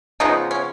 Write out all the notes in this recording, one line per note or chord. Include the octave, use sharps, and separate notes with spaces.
C#3 F3 B3 D#4
C#4